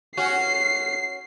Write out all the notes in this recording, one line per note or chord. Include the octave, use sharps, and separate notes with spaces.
C#4 F#4 C7